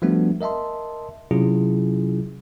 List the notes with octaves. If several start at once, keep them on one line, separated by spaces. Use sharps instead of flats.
F3 G3 A3 B3 D4 F#4
A#4 D#5 E5 A5 C6
C3 F#3 C#4 E4 F4 G#4